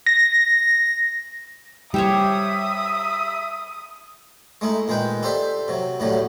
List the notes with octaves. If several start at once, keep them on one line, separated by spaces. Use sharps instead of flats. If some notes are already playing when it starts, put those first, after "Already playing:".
A#6
G3 G4 C5 C#5 E5 D#6
G#3 A3 D#4 E4
A#2 D#3 G#3 B4 G5
G4 A4 C5 D5 E5
C3 F#3
D#2 A2 D3 F#3 G3 A3